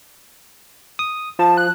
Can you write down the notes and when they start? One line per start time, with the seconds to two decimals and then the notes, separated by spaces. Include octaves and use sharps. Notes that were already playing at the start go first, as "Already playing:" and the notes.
0.99 D#6
1.39 F3 A5
1.57 F#6